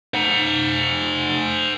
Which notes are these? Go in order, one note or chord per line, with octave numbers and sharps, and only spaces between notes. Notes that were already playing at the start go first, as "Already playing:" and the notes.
C5 F#5